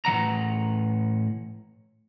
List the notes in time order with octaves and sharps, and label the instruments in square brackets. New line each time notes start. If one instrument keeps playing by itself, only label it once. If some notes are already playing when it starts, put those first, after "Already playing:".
[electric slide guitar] A2 E3 F#5 A#5